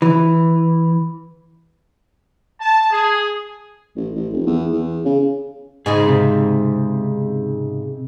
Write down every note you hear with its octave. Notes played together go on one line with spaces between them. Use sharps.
E3
A5
G#4
A1
A1
F1
E2
E2
C#3
G#2 C#3 G#3 D#4 G#4
C3